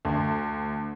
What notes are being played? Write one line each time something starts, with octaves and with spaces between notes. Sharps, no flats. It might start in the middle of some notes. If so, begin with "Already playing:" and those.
D2